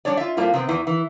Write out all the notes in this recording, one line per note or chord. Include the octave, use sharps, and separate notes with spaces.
G3 D4 C#5 D5
F4 E5
A2 G3 A#3 C4 F4
C3 B3 C4
E2 E3
E3